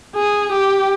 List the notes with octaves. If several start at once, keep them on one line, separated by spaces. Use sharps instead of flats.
G#4
G4